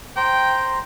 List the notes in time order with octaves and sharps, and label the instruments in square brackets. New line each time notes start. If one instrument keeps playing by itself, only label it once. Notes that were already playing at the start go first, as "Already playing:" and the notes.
[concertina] C5 A#5 [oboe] G5